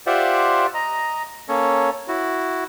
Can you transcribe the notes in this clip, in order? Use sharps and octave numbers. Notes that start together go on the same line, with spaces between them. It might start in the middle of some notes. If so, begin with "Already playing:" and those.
F4 G4 C5 D5 E5 F#5
D#5 A#5
A#3 C#4 A4 C#5
E4 F#4